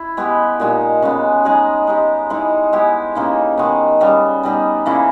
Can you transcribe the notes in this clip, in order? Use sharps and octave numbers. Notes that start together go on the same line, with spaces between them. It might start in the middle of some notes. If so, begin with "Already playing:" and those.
Already playing: E4
G#3 B3 G4
A#2 G#3 D#4 G4
C#3 G#3 B3
G#3 D#4 G#4
G#3 D#4 G4
E3 G#3 D#4 G#4
G#3 B3 E4 G4
C#3 E3 A#3 D#4
D#3 G#3 B3
C#3 G3 B3
G3 B3 D#4 G#4
C#3 E3 A#3 E4